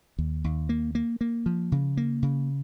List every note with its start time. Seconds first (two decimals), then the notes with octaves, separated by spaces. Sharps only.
0.19 D#2
0.44 D#2
0.69 A#3
0.95 A#3
1.21 A#3
1.46 F3
1.72 C#3
1.97 A#3
2.23 C#3